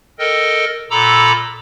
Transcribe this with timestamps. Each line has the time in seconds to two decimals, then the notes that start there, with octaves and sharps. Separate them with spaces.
0.19 A4 A#4 D#5 G5
0.90 A#2 A4 A#5 B5 D6 E6